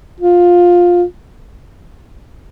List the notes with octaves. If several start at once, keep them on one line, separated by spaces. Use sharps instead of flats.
F4